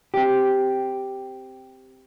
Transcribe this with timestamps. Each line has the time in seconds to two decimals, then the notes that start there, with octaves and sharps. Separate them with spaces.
0.14 C4 G4